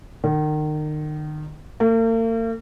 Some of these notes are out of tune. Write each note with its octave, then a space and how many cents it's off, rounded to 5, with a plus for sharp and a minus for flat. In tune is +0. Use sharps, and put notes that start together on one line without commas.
D#3 -35
A#3 -45